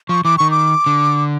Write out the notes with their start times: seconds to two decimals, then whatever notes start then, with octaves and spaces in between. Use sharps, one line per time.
0.09 F3 C#6
0.24 E3 D6
0.38 D#3 C#6
0.51 D6
0.86 D3